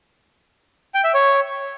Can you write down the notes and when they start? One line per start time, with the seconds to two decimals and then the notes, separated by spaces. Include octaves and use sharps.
0.94 G5
1.04 E5
1.14 C#5